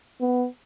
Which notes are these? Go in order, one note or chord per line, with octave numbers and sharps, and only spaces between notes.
B3